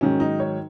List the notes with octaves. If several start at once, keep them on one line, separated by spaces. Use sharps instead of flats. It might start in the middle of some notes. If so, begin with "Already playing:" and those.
G#2 D#3 F#3 C#4
D#4
C#5